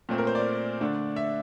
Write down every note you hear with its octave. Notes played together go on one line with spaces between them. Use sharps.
A#2 A3 C4
A#4
C5
D5
D3 A3 D4
E5